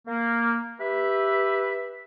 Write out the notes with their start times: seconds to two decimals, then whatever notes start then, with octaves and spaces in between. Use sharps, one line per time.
0.08 A#3
0.80 G4 B4 E5